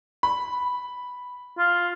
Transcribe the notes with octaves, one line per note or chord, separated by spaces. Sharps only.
B5
F4